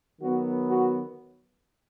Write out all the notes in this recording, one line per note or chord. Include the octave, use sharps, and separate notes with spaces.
D#3 F#3 B3 F#4
F#4